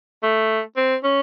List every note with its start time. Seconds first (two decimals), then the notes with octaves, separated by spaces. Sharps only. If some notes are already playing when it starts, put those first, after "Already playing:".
0.23 A3
0.76 C4
1.04 C#4